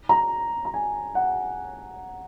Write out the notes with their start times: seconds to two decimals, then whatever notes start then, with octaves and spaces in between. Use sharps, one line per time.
0.09 A#5
0.65 A#5
0.74 G#5
1.15 F#5